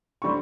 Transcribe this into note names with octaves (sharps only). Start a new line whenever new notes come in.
D3 G3 C4 C#6